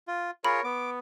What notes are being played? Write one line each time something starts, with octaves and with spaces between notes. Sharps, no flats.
F4
F4 G#4 A#4 C#5 B5
B3 D6